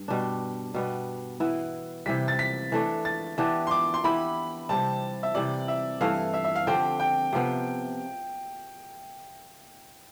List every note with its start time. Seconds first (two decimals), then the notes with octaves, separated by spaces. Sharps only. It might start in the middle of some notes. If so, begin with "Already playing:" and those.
Already playing: G2
0.08 B2 G3 D4
0.74 B2 G3 B3
1.40 E3 B3 E4
2.06 C3 E3 G3 B6
2.28 A6
2.39 B6
2.72 E3 A3 D4
3.05 A6
3.38 E3 B3 D4 G4
3.67 C6
3.71 D6
3.94 C6
4.04 E3 B3 E4 G4 B5
4.69 C3 G3 C4 A5
5.23 E5
5.35 C3 E3 G3 D5
5.68 E5
6.01 G2 E3 A3 E4 F5
6.34 E5
6.44 E5
6.56 F5
6.67 D3 F3 C4 G4 G5
7.00 G5
7.33 C3 F3 B3